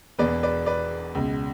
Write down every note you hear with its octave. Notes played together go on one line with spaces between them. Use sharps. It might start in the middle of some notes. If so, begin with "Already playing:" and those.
E1 E2 B2 B4 D5
B4 D5
B4 D5
C#2 B2